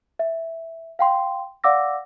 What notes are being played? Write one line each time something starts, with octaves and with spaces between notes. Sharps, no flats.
E5
F5 G5 C6
D5 F5 F#5 D6 E6 A#6